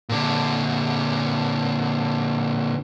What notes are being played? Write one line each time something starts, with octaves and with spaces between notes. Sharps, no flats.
A#2 D3